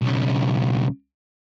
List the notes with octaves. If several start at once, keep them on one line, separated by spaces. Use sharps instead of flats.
B1 C#3